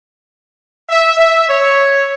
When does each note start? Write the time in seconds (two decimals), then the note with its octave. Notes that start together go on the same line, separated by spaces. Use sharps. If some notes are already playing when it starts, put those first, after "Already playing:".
0.89 E5
1.18 E5
1.49 C#5